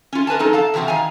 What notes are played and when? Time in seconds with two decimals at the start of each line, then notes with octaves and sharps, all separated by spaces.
0.13 C#4 F4
0.27 A#4 B4 G#5 A5
0.39 F2 F3 D#4 A4
0.53 A4 F5 A5
0.74 E2 C3 F3 C4 F#4
0.88 D#3 F5 G#5